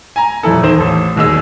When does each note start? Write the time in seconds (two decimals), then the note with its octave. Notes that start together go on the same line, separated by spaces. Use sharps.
0.16 G#5 A#5
0.43 D#1 F2 E4 A4
0.63 E2 D#3 C5 E7
0.78 A1 A5
1.16 E1 D#2 G#4 D#5 E6